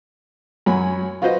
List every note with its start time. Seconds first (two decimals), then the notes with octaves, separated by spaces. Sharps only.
0.66 F#2 F#3 C#5 G#5 B5
1.22 F4 F#4 B4 C5 D#5